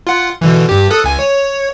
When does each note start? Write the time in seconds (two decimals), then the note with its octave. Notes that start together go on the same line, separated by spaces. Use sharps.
0.07 F4 F#5
0.41 B2 D3 E3
0.69 G2 G4
0.90 A4 D#6 F#6
1.04 C#2 G#5
1.19 C#5